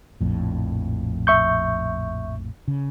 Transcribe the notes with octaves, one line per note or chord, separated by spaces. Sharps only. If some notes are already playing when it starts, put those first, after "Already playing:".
A#1 F2 A2
E5 C#6 G6
C#3